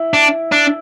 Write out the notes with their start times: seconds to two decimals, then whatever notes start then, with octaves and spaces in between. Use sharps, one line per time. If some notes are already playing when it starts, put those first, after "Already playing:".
Already playing: E4
0.13 D4
0.52 D4